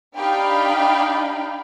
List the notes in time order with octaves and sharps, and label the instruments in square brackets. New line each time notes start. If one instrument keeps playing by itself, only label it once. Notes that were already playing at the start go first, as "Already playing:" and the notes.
[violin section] D4 D#4 G4 F5 G5 B5